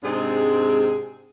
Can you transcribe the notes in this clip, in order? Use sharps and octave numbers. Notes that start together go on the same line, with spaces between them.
G#2 C3 G#3 C4 D4 G#4